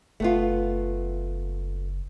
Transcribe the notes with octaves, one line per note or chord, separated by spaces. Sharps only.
F#1 A3 B3 F4